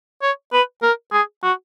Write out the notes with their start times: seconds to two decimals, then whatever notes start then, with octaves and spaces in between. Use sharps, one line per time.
0.22 C#5
0.53 B4
0.83 A#4
1.13 G#4
1.43 F#4